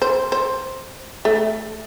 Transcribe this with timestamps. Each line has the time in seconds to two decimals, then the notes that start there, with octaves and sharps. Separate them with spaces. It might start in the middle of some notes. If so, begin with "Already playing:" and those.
0.02 C5
0.32 C5
1.25 A3